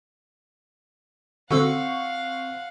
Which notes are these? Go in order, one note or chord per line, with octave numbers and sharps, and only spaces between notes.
D3 C4 F#4 A4 F5 F#5 C#6 E6